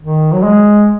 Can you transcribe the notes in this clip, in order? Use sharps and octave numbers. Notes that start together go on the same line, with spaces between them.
D#3
F#3
G#3